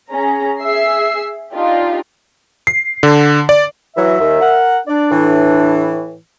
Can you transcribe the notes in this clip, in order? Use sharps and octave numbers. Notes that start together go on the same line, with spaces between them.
C#4 G#4 A#5
G#4 E5 E6 C7
D4 D#4 F4 G4
C7
D3
D5
E3 F#3 E5
D#2 D#3
A#4 F#5
D4 D5
A2 E3